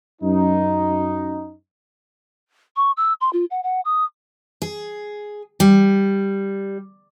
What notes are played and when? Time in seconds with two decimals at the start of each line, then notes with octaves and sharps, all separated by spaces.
0.21 F#2 D#4
2.76 C#6
2.97 E6
3.21 C6
3.33 F4
3.51 F#5
3.63 F#5
3.85 D#6
4.62 G#4
5.60 G3